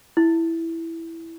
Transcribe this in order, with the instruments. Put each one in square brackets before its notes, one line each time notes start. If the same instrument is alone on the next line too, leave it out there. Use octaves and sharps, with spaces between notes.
[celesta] E4